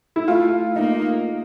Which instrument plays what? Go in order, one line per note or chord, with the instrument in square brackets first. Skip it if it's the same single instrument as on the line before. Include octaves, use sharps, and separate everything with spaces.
[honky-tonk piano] E4
[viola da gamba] A3 [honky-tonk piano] F4
[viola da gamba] A#3 [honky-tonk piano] D#4